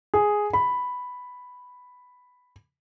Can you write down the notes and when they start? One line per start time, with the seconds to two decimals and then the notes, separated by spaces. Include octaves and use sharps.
0.14 G#4
0.53 B5